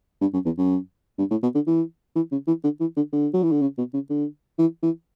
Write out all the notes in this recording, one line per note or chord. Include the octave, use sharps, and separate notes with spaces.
G2
F#2
E2
F#2
G2
A2
B2
D3
E3
E3
C#3
E3
D3
E3
D3
D3
F#3
E3
D3
C#3
B2
C#3
D3
E3
E3